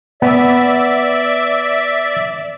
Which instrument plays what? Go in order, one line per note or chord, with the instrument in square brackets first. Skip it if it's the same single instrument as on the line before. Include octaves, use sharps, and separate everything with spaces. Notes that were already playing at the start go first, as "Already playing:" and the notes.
[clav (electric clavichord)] B3 [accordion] D5 E5